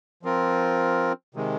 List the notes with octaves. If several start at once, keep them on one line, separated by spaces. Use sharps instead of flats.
F3 C4 F4 A#4
C3 D#3 G#3